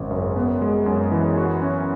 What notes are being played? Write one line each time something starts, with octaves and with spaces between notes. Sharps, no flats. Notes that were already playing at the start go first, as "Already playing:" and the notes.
Already playing: G#1 C#3 G#3
F#2
B3
G#3
F#2
E3
F#4
C#4